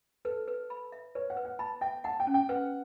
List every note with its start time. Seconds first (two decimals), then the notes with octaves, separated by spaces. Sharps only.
0.25 A4 B4
0.48 B4
0.70 B5
0.92 E5
1.15 B4 C#5
1.30 F#5
1.37 B4
1.45 F#5
1.59 A5 B5
1.81 E5 G5
2.04 F#5 A5
2.20 G5
2.27 C#4
2.34 G5
2.49 B4 F#5